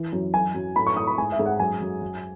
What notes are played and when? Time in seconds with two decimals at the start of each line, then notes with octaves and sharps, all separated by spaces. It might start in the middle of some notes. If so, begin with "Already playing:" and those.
Already playing: E3
0.13 F#2
0.33 F#3 G#5
0.55 F#2
0.76 A2 B5
0.87 C#6
0.96 A2 D#6
1.07 B5
1.18 G#2 G#5
1.32 E5
1.39 G#2
1.46 F#5
1.59 F#2 G#5
1.81 F#2
2.01 F#2